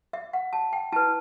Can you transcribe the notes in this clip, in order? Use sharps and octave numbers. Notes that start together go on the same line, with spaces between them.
E5
F#5
A5
G5
E4 B4 A5